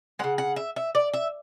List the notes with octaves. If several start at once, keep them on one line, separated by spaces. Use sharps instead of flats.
C#3 G#3 F#5
F#5
E5
E5
D5
E5